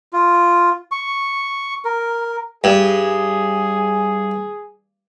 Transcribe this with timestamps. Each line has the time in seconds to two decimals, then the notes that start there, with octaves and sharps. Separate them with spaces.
0.13 F4
0.91 C#6
1.85 A#4
2.64 G2 G#4